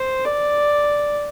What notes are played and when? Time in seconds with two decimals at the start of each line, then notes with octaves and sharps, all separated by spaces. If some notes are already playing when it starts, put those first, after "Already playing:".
Already playing: C5
0.26 D5